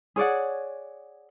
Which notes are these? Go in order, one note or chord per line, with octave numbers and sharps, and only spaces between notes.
G#4 C#5 D5 F#5